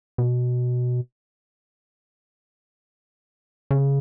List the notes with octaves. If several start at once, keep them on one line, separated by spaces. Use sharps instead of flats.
B2
C#3